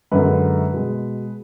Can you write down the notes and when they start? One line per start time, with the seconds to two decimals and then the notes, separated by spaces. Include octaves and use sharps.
0.11 F#2 D3 G#3 B4
0.73 B2 G#3